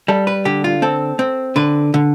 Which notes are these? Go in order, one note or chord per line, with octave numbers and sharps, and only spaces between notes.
G3 A4
B4
D3 G4
F4
C4 A4
C4
D3 B4
D3